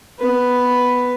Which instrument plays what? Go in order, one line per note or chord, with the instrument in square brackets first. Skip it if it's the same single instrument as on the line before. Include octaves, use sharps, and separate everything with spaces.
[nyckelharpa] B3 B4